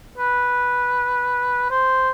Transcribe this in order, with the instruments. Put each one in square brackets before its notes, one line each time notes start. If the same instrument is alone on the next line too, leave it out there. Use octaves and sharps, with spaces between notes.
[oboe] B4
C5